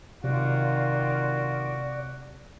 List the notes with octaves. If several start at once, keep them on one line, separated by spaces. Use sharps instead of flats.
C3 D#3 F#3 F4 F#4 D5